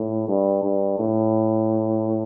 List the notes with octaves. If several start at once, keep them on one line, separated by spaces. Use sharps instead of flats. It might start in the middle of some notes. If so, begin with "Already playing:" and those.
Already playing: A2
G2
G2
A2